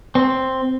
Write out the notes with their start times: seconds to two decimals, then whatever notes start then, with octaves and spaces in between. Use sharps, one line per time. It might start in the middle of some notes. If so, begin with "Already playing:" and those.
0.15 C4